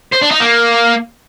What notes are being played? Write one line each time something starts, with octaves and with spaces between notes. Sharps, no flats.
C5
D4
D#4
A#3